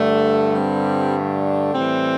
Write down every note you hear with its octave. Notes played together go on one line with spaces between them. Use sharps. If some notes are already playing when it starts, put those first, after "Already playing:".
Already playing: G2 D3 A3
G3 C4
A3 D4
A2 E3 G3 C4